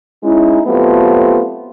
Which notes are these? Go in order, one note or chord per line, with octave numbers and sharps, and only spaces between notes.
G#3 C#4 D#4 E4
F#3 A3 B3 C4 F4 G4